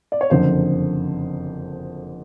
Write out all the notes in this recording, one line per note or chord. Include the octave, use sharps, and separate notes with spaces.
D5
C#5
F#1 F2 D3 C5